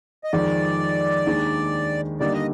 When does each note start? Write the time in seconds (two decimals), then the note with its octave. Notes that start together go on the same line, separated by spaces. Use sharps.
0.24 D#5
0.32 F2 D#3 G#3 D5
1.27 D#2 D#3 G#3 D4
2.20 D3 G3 A#3 D#4 D5
2.34 D#5